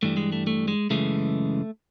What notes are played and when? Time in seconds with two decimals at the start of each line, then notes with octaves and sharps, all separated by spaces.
0.03 G2 E3 G3 A3
0.17 G#3
0.32 A3
0.47 A3
0.68 G#3
0.90 F#2 C#3 E3 G#3 A3